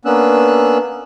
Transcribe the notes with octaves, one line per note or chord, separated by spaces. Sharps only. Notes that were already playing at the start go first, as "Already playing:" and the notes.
A#3 B3 C#4 D4 E6 F#6